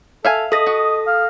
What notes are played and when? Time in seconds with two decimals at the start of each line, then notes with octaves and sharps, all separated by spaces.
0.25 A4 E5 F5 G#5
0.52 A4 D#5 D#6 A#6
0.67 F#4
1.07 F5